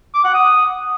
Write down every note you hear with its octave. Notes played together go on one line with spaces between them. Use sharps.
D6
F#5
D#6